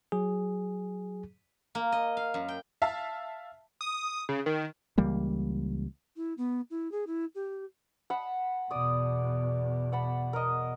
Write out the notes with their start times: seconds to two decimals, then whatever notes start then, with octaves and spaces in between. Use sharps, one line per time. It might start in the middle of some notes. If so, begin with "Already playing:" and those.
0.12 F#3 G#4
1.75 A#3
1.92 D#5
2.17 F5
2.34 F#2
2.48 G5
2.82 E5 F5 A5
3.81 D#6
4.29 C#3
4.46 D#3
4.98 C#2 E3 G3 A#3
6.16 E4
6.37 B3
6.70 E4
6.91 G#4
7.07 E4
7.35 G4
8.10 F#5 A5 B5
8.71 E2 B2 D5 D#6
9.92 F#5 A5 B5
10.33 A#4 D#5